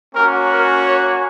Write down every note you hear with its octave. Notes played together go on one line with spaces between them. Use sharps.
A#3 C#4 F#4 A#4
A#4
C#5